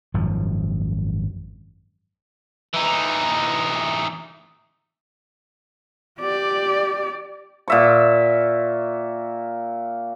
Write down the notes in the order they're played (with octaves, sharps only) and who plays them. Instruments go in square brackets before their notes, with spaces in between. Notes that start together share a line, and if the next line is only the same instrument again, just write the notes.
[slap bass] G#1 F#2 F3
[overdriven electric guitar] E3 D#4
[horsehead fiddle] G4 D5
[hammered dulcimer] A#2 E5 C#6